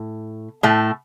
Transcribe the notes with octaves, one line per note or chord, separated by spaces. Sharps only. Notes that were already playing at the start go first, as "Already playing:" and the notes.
Already playing: A2
A2 A3